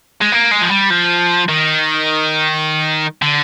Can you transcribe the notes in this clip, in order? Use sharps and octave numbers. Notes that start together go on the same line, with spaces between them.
G#3
A#3
G#3
F3
G3
F3
D#3
D3